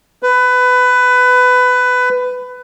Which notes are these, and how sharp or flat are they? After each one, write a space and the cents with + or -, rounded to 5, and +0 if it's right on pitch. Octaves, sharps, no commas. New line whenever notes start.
B4 +20